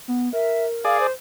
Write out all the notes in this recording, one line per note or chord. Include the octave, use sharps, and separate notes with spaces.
B3
A#4 E5
G#4 D5 F5
C5